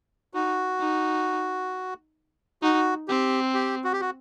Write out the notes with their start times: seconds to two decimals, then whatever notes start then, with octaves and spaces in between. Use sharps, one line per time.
0.34 D#4 F#4
0.80 D#4
2.62 D#4 F#4
3.08 C4 G4
3.54 G4
3.84 F#4
3.93 G4
4.01 F#4